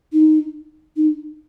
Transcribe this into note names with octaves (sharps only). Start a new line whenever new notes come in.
D#4
D#4